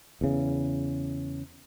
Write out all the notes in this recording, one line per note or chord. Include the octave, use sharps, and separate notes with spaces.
E2 C#3